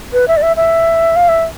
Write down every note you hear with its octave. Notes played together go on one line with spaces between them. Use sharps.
B4
E5
D5
E5
E5
F5
E5